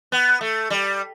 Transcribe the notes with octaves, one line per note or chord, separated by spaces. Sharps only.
B3
A3
G3